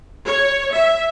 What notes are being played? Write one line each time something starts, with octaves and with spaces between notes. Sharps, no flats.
C#5
E5